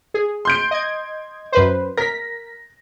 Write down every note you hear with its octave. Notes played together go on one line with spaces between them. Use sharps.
G#4
C6 G6 D7
D#5 G#6
F#2 B4 C5
A#4 A#6 B6